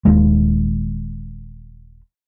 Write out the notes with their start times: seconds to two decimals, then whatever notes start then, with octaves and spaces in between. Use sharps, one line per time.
0.05 D#1 D#2 G#3